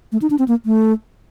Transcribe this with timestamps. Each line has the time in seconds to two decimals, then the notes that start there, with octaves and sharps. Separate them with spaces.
0.12 A3
0.22 D#4
0.30 D4
0.39 C4
0.48 A#3
0.66 A3